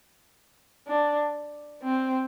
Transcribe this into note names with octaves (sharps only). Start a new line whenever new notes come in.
D4
C4